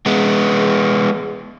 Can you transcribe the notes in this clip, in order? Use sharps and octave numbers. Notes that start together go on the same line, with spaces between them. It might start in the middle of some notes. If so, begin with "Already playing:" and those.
G#3 B3